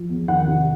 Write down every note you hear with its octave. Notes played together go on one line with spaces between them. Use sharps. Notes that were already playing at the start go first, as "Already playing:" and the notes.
Already playing: F3
E2
D#3 F#5
C3